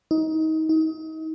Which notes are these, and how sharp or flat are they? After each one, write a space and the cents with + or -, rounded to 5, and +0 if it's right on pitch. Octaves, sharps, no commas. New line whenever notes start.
D#4 +25
D#4 +35